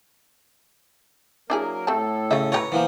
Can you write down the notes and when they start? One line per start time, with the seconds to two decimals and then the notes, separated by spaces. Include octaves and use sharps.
1.50 F#3 A#3 D4 E4 G#4 A#4
1.87 A2 A3 C4 A4 A5
2.31 C#3 A3 F4 E5
2.52 F4 G4 B4 C#5 A#5
2.72 E3 F3 A#3 B3 C5 F#5